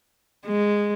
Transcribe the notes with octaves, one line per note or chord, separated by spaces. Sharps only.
G#3